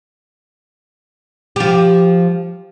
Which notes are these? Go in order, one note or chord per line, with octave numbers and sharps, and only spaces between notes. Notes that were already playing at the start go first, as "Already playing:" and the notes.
F3 G4